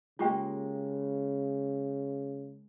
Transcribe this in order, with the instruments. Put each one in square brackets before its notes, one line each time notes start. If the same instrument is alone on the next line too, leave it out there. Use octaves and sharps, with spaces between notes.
[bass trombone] C#3 [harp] G#3 A#3 [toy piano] F4 G4 G5